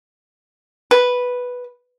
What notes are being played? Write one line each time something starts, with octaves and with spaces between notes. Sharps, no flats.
B4